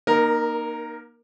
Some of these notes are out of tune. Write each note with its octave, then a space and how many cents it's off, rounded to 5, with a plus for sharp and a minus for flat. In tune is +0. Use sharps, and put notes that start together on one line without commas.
A#3 +30 D#4 -20 A#4 +0